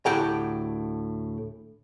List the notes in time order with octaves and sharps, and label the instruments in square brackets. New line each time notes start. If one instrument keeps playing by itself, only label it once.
[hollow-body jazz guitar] D2 A2 G4 F#5 G5 A#5